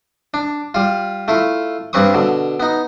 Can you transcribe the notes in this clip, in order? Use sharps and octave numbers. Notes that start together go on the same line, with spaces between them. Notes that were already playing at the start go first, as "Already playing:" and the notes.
D4
G3 F4
A3 E4 F4
G2 G3 C4 B4 C#6 D#6
B2 D3
B3 D#4